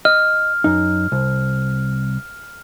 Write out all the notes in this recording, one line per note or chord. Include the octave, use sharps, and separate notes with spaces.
D#5 F6
F#2 D#4
C2